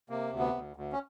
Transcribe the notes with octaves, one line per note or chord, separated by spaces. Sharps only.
C3 A#3
D2
B3
D2
D2
C#4